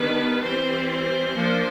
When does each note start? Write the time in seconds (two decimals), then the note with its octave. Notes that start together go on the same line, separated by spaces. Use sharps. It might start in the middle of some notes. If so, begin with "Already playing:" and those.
Already playing: D#3 G3 B3 D4 B4
0.43 E3 G3 C4 C5
0.89 C5
1.35 F3 A#3 D4